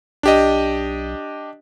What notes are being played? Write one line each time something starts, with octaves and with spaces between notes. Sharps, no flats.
B1 D4 G4 D#5